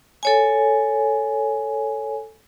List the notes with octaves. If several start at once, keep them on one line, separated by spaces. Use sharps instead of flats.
A4 C#5 G#5